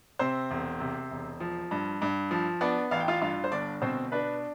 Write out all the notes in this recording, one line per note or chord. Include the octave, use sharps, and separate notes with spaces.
C3 C4 C5
E1
C3
E1
F3
G2
G2
F3
B3 D4 D5
A1 F5
G5
F4 F5
G2 F4 F5
C5
G1 D4 D5
B2 C4 C5
D4 B4